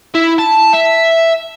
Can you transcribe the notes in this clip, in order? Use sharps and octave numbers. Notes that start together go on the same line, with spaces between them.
E4
A5
E5